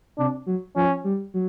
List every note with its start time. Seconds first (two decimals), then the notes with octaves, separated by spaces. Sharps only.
0.18 C3 D4
0.46 F#3
0.75 F3 C#4
1.04 G3
1.34 F#3